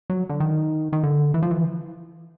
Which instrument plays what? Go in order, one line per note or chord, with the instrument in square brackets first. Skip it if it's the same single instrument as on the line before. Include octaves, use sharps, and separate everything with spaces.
[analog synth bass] F#3
D3
D#3
D#3
D3
E3
F3
E3